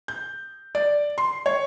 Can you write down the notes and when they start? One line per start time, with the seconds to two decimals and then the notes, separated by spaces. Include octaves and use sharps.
0.08 G6
0.75 D5
1.18 C6
1.46 C#5